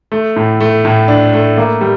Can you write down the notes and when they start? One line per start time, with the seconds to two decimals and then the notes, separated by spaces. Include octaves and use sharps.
0.12 A3
0.36 A2
0.60 A3
0.85 A2
1.08 D4
1.33 A3
1.58 A#3
1.81 G3